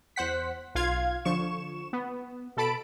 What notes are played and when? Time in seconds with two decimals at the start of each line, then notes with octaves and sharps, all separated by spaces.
0.16 E2 C5 F#5 B6
0.75 B1 F4 F5 G#6
1.25 D3 F3 C#6 E7
1.93 B3
2.57 B2 A4 A5 B5 D7